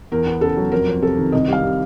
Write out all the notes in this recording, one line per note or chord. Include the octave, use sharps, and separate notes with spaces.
E2 A#4
B3
C#3 A4
F#3
F2 A#4
F2
C3 A4
D#3
C2 D#5
G3
F5
C3